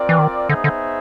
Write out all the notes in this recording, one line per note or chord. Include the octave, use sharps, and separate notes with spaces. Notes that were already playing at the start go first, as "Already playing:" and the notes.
Already playing: C4 F4 A#4 D5 G5
E3
D#3
D3 B3 D#4 G#4 C5 E5
D3